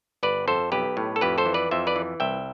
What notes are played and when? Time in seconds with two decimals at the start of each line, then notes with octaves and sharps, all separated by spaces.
0.23 G1 B4 D5
0.48 F2 A4 C5
0.72 B1 G4 B4
0.97 A2
1.16 A4
1.21 F2 G4 B4
1.38 A4 C5
1.46 E3
1.54 B4 D5
1.71 F2 C5 E5
1.87 B4 D5
1.96 E3
2.20 C2 E5 G5